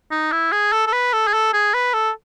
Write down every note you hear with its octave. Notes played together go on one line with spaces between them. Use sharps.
D#4
E4
G#4
A4
A4
B4
A4
G#4
A4
G#4
B4
A4